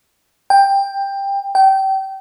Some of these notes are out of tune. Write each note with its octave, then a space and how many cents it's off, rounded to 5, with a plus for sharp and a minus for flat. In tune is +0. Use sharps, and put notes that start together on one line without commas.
G5 +15
G5 -25